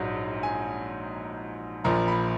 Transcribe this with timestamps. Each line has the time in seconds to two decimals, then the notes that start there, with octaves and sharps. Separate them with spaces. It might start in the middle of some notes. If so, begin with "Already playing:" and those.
Already playing: A#1 G#2 F#3
0.43 G#5
1.84 A#1 A#2 F3 A#5
2.08 B5